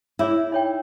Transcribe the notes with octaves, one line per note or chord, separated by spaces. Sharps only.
E4 G#4 C#5 E5
D#4 C#5 G5